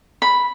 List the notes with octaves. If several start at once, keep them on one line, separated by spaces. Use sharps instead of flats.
B5